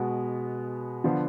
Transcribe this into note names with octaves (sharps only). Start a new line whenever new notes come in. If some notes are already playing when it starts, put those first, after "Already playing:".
Already playing: B2 G#3 B3 F#4
D3 F3 B3